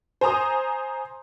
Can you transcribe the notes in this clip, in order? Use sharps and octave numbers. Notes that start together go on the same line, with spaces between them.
C5 G#5 A#5 D#6